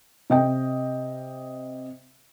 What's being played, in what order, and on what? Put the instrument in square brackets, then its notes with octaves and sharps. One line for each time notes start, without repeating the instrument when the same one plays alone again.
[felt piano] C3 D#5 G5